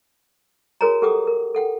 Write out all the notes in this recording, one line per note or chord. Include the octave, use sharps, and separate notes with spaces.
F#4 G#4 A#4 C#5 G#5 A#5
G4 A4 F#5 G5 D6 D#6
A#4
A4 F#5 G5